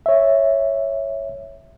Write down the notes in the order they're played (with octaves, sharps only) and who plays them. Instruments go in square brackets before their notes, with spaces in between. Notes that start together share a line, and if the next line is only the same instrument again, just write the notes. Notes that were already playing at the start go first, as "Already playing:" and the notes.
[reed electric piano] C#5 E5